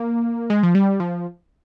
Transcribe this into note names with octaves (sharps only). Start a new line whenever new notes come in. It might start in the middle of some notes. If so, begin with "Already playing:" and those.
Already playing: A#3
G#3
F3
G3
F3